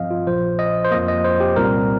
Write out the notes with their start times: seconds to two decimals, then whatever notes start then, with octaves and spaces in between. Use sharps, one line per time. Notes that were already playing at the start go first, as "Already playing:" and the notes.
Already playing: G2 F3 C4 D#5 F5
0.11 F4
0.27 A#1 A#2 F3 C5
0.59 D#5
0.84 C5
0.91 F2 F3 A#3 D#5
1.08 D#5
1.24 C5
1.40 G4
1.56 C2 A#2 G3 C4 A#4